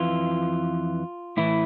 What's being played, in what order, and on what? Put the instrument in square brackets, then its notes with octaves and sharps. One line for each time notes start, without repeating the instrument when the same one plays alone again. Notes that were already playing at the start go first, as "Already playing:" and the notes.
Already playing: [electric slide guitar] F2 E3 F4
A2 E3 E4